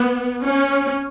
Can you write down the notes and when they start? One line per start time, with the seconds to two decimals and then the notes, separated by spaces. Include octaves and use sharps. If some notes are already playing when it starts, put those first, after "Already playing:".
Already playing: B3
0.44 C#4